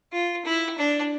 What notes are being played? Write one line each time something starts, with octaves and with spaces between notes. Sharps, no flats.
F4
E4
D4